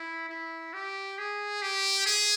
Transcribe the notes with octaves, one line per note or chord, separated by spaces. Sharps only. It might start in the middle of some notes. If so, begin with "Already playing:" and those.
Already playing: E4
E4
G4
G#4
G4
G#4